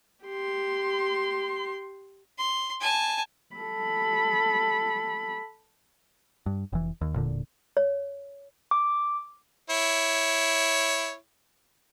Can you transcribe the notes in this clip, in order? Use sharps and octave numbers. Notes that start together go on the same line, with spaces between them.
G4 C6
C6
G#5 A5
A4 B5
G2
F1 E3
D#2
E1 A#2 D3
C#5
D6
E4 C#5